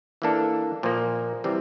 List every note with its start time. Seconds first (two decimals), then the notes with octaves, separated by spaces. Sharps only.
0.22 E3 A#3 D4 A4
0.83 A#2 F3 A#3
1.44 C3 E3 G3 C4